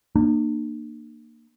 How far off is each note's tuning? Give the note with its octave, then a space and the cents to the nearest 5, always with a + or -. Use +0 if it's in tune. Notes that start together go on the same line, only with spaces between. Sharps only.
A#3 -5 D4 +45